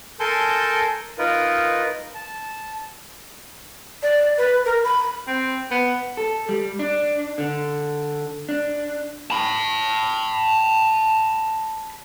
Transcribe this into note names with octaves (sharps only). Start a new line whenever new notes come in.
A4 A#4 G#5 A5 C6 G6
D#4 F4 A#4 B4
A5
D5
B4
A#4
B5
C4
B3
A4
G3
D4
D3
D4
A5 B5